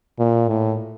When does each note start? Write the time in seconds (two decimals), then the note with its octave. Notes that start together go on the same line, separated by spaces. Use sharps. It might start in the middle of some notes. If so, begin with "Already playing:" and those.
0.19 A#2
0.48 A2